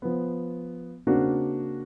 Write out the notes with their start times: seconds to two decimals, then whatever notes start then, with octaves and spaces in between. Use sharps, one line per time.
0.02 F3 B3
1.07 C#3 A#3 C4 D4 F#4 A#4